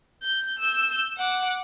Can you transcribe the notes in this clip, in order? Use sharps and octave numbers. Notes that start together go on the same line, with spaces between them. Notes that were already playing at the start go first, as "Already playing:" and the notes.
G6
E6 G6
F#5 D6